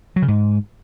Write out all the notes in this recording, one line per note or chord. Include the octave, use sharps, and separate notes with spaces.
F#3
C#3
G#2